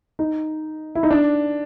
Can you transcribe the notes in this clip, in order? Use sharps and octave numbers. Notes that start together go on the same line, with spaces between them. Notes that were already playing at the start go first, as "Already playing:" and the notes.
D#4
E4
D#4
D4